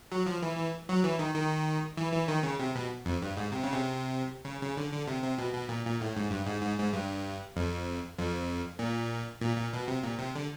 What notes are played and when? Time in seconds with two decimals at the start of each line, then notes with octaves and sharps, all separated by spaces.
0.12 F#3
0.26 F3
0.42 E3
0.57 E3
0.89 F#3
1.04 E3
1.19 D#3
1.35 D#3
1.97 E3
2.13 E3
2.28 D#3
2.43 C#3
2.59 C3
2.75 B2
3.05 F2
3.22 G2
3.37 G#2
3.52 C3
3.63 C#3
3.73 C3
4.45 C#3
4.61 C#3
4.77 D3
4.92 D3
5.07 C3
5.23 C3
5.38 B2
5.53 B2
5.69 A#2
5.85 A#2
6.01 A2
6.17 G#2
6.31 G2
6.47 G#2
6.62 G#2
6.78 G#2
6.93 G2
7.56 F2
8.18 F2
8.79 A#2
9.42 A#2
9.57 A#2
9.73 B2
9.87 C3
10.03 A#2
10.19 C3
10.35 D3